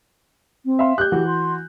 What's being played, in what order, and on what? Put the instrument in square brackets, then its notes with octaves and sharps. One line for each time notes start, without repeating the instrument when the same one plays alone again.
[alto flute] C4
[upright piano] E5 F5 C6
[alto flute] G4 [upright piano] F#6 G6
[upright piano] E3 F#4
[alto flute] C6